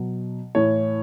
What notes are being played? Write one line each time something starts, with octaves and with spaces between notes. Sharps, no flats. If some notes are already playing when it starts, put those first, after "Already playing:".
Already playing: B2 F#3
A2 E3 C#5